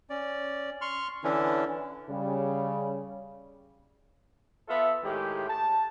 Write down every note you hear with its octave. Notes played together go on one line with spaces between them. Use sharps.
C#4 D5
C6 C#6 F6
D3 E3 C#4 D4 E4
C#3 G3
B3 F4 A4 E5
A2 D#3 G#3 G4
A5